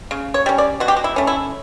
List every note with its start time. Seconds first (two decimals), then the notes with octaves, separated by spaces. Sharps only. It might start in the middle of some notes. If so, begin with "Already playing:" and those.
0.11 C#3
0.34 C#5
0.46 G3 C#4
0.58 D5
0.80 B2 F#4
0.88 G4
0.96 F#4
1.04 E4
1.16 A3 C#4
1.27 E4